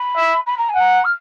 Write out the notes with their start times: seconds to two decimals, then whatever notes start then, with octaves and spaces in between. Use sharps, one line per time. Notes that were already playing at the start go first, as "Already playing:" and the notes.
Already playing: B5
0.17 E5
0.46 B5
0.58 A#5
0.69 G#5
0.75 F#5
0.80 A#5
1.04 F6